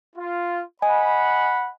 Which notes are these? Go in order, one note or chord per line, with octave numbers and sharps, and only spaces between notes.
F4
D#5 F#5 G#5 B5